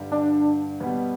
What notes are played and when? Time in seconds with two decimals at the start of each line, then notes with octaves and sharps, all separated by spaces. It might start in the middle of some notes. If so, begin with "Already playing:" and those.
Already playing: G2 D3 G3
0.11 D4
0.80 B2 G3 B3